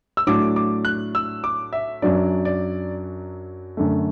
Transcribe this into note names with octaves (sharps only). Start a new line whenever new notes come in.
E6
A2 F#3 D4 D6
D6
F#6
E6
D6
E5
F#2 F#3 D4 D5
D5
F#2 D3 A3